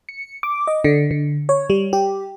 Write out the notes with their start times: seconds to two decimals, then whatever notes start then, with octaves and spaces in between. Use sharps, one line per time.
0.09 C#7
0.43 D6
0.67 D#5
0.84 D3
1.11 D3
1.49 C#5
1.70 G3
1.93 G4